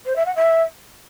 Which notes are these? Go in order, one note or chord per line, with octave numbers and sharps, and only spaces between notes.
C5
E5
F#5
E5